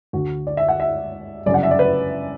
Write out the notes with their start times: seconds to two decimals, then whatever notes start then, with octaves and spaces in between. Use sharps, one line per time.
0.13 D2 D3 F#4
0.47 D5
0.57 E5
0.68 F#5
0.80 E5
1.46 G1 F#2 C#3 D5
1.54 F#5
1.63 E5
1.71 D5
1.79 B4